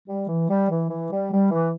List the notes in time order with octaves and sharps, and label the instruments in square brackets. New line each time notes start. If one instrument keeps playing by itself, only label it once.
[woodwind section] G3
E3
G3
E3
E3
G3
G3
E3